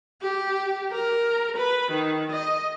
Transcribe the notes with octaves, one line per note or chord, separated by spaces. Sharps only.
G4
A#4
B4
D#3
D#5